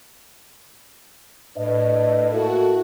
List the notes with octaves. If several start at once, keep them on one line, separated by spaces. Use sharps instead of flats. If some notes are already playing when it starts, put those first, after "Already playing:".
A2 D4 B4 D#5
A#3 E4 F#4 A4